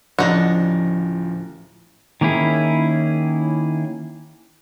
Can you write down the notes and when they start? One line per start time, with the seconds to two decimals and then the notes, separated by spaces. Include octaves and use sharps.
0.19 D1 C#3 F3 D4 D#4 F#4 A#6
2.21 D#3 A#3 C#4 E4 G#4